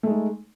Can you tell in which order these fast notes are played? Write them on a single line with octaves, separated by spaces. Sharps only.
A3 G#3 D#4